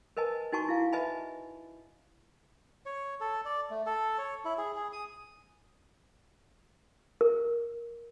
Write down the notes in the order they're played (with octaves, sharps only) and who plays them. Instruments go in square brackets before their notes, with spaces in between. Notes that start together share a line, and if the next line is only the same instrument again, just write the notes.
[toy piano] A#4 B4 D#5 G#5 A5
D#4 F#4 G#5 A5 C#6
E4 F5
B4 D#5 E5 G#5 A5 B5
[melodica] C#5
A4
D5
A3
A4
C#5
E4
G#4
G#4
D#6
[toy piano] A#4